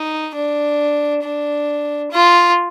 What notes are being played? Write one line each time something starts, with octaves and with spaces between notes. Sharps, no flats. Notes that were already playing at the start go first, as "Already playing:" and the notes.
Already playing: D#4
D4
D4
F4